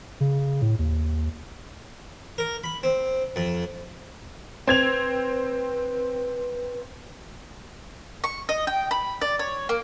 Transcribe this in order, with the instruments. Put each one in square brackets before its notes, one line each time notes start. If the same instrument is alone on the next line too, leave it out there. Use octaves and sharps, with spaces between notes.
[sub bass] C#3
A2
D#2
[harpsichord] A#4
B5
C4
F2
[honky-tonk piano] C4 G#6 F7 [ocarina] B4
[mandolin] C#6
D#5
G5
B5
D5
C#5
A#3